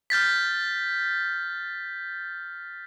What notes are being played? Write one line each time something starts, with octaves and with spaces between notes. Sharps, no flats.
F6 G6 A6 B6